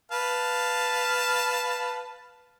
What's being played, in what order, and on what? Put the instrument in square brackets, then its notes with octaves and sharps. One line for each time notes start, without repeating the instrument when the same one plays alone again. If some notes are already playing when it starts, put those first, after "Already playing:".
[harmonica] B4 F5 A5